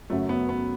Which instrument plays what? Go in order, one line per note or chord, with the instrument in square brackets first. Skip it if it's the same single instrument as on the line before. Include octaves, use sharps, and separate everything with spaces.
[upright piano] F#2 C#3 F#3 C#4 F#4 [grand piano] A3
[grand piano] B3
B3